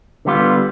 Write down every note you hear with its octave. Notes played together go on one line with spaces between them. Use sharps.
D3 G3 B3 F4